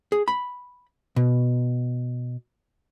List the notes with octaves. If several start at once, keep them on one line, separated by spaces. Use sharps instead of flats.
G#4
B5
B2